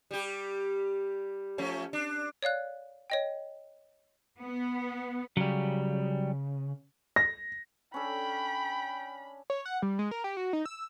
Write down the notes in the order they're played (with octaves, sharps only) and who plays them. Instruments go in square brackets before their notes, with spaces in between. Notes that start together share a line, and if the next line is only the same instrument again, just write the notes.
[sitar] G3 G4
F3 A3 C#4
D4
[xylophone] C#5 D5 F5 F#6
C#5 D#5 G5
[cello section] B3
[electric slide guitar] C#3 [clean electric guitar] F#3 G3
[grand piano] A#6
[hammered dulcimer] C#4 D4 A4 [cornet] G5 [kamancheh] B5
[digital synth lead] C#5
F#5
G3
G#3
A#4
G4
F#4
D#4
E6